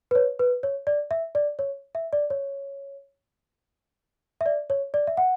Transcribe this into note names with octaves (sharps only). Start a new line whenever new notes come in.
B4
C#5
B4
C#5
D5
E5
D5
C#5
E5
D5
C#5
E5
D5
C#5
D5
E5
F#5